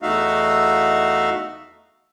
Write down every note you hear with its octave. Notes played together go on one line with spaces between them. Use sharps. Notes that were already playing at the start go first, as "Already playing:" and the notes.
E2 A3 D#4 F#4 E5 F5